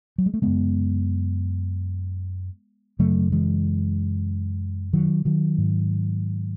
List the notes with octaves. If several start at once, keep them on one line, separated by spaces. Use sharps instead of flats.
F#3
G#3
A3
F#2 C#3 G#3 B3
F#2 C#3 F#3 A3
E3 G#3
D#3 F#3
D#3 F#3
G#2